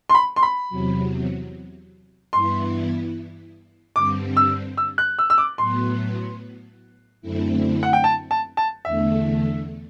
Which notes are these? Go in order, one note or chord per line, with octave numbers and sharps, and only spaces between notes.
C6
B5
C6
B5
E2 C3 F#3
G2 E3 B3 E4 C6
G2 D3 G3 C4 D6
E6
E6
F#6
E6
E6
D6
A2 F#3 B3 C6
F#2 D3 A3 C4 E4
F#5
G5
A5
A5
A5
E2 D3 A3 E5